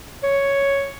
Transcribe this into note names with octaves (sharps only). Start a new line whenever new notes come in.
C#5